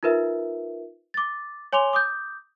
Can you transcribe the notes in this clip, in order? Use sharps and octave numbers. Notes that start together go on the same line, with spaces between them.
D#4 F4 A#4 B4 E5
D6 A6
C#5 G#5 C6 D6 F7 G7
D6 D#6 G6